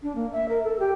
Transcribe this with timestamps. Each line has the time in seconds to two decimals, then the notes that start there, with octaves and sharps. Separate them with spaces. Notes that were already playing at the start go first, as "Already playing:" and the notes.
0.03 D4
0.15 A#3
0.32 E5
0.49 A#4
0.64 A4
0.79 G4